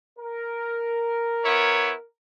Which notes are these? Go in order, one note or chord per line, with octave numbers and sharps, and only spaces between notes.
A#4
B3 E4 C#5